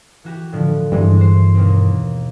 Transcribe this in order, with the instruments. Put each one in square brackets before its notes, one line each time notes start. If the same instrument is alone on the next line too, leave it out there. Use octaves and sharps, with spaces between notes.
[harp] E3 F#4 G4
A2 D3 F3
[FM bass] G2 [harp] E3 G#3 C4
[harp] F#4 C5
D#2 B2 C4